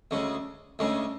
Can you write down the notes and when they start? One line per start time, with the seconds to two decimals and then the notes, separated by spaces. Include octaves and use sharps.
0.11 D2 C#3 G#3
0.79 D2 C#3 G#3